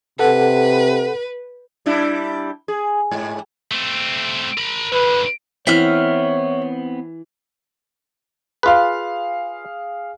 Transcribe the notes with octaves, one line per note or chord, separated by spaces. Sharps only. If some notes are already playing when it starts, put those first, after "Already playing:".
C3 A4 B4 F#5
G3 D4 E4
G#4
G#2
A3 C4
A#4 B5
F#2 D3 B4
E3 B3 C4 C#5 E5 F#5 F6
F4 G#4 B4 F5